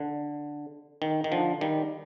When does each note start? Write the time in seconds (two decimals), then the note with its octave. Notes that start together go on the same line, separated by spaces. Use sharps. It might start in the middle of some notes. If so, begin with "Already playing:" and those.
Already playing: D3
1.02 D#3
1.24 D#3
1.32 D3 F3
1.61 D#3 G3